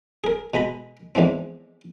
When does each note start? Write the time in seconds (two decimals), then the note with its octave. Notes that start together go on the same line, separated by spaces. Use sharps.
0.24 G#4 A#4
0.54 B2 G#3 A#5 B5
1.15 E2 G#2 E3 F3 C4